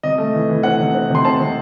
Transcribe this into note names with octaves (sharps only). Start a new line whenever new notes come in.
C3 D#5
A3
E3
E3
C4 F#5
C3
C4
C3 C6
C4 A5
C3